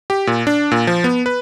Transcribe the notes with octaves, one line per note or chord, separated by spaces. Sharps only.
G4
A#2
D4
A#2
F3
B3
B4